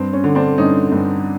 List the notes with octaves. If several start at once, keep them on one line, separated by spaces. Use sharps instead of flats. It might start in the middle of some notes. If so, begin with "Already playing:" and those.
Already playing: G2 C4
C#4
D3
C4 D4
G2 C#4 D#4
G2